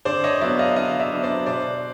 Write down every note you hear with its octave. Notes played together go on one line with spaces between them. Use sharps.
D3 C5 D5
C#5 D#5
F#3 B3 D4 D5 E5
D#5 F5
D3 D#5 F5
D5 E5
F#3 B3 D4
C5 D5
B2 C5 D5